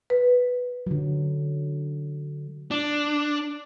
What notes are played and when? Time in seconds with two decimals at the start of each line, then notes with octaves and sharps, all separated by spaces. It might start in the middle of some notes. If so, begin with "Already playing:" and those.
0.10 B4
0.87 D3 F#3
2.71 D4